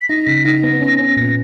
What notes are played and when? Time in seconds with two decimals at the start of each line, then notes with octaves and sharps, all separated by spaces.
0.02 B6
0.09 D#4 A#6
0.26 C#3 B6
0.45 D#4 A#6
0.63 B3
0.81 C#4
0.99 C#4
1.17 A#2 A#6